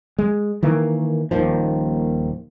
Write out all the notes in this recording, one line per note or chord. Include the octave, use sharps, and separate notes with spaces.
G#3
D#3 E3 A#3
D#1 D#2 D#3 F3